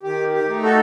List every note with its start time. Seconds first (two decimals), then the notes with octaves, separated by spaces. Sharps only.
0.03 D#3 G4
0.34 G4
0.48 A3 D#4
0.63 F#4 A4